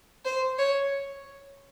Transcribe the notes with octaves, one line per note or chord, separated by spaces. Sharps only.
C5
C#5